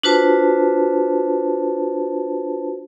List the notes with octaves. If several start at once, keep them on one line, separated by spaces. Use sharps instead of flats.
D4 F4 F#4 B4 C5 A5